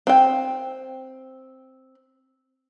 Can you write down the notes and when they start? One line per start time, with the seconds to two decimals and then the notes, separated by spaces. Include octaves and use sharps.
0.07 C4 G5